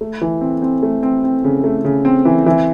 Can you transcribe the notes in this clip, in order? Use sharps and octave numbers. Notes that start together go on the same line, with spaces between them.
A3
E3
C4
C4
A3
C4
C4
C#3
A3
C#3
C4
E3
E3